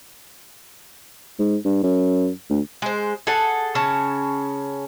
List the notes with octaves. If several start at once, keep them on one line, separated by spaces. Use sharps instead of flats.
G#2
G2
F#2
D2
G#3 C5
G#4 A4 F#5
C#3 C#4 C#5 A5